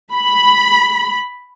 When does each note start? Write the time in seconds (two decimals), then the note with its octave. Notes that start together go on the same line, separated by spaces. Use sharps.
0.12 B5